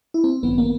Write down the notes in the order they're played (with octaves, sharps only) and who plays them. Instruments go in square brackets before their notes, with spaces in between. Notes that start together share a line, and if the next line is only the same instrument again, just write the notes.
[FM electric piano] E4
C4
A1 G2 D#3 F#3 B3
A#3